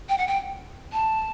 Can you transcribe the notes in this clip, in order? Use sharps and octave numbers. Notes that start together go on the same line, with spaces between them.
G5
F#5
G5
A5